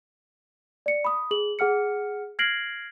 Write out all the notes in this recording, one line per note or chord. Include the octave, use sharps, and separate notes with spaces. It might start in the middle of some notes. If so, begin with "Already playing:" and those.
D5 C#7
B5 D#6
G#4 F#7
G#4 F#5 F6 C#7
F6 G#6 A#6 C7 D7 F#7